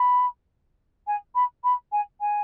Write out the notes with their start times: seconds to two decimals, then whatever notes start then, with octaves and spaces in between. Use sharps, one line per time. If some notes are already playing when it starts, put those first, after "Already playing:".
Already playing: B5
1.07 G#5
1.35 B5
1.64 B5
1.92 G#5
2.21 G#5